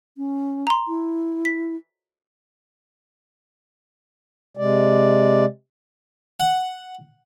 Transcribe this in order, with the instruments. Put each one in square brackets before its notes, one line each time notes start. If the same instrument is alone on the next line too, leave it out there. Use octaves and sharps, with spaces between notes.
[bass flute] C#4
[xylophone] A#5 C6
[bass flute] E4
[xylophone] B6
[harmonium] C3 G#3 D5
[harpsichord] F#5